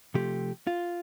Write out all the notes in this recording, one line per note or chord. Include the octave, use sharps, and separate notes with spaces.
C3 F3 A3 G4
F4